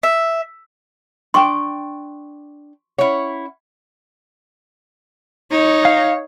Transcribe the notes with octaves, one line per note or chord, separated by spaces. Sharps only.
E5
D4 G5 C6 C#6
C#4 E4 C#5 F#5
D#4 C#5
F5